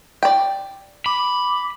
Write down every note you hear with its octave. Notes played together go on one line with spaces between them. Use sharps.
D5 G5
B5 D6